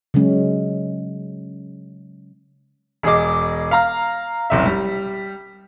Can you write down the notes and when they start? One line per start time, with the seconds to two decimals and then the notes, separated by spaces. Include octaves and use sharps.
0.14 C#3 F#3 G#3 C#4
3.03 E1 G#4 D#5 D6
3.71 F5 A#5 F6
4.50 F#1 C2 E5
4.65 G3